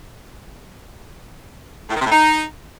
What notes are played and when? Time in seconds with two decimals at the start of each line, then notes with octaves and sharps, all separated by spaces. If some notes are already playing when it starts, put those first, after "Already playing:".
1.89 A2
1.94 D#3
1.99 C3
2.05 A2
2.10 D#4